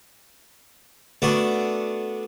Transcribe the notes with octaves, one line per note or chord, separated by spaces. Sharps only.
A3 B3 D4 F#4 A4